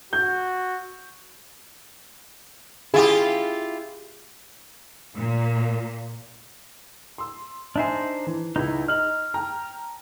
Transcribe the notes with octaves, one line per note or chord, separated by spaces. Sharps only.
F#4 G6
E4 F4 G4 G#4
A#2
C6 E6
D4 D#4 C5 D#5 E5 G#5
E3
C#2 D#4 E4
D#4 F6 F#7
G5 A5 A#5